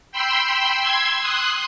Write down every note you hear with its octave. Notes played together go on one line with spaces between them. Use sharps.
G5 B5 C6 E6
C6 E6 G#6
C6 D#6 F#6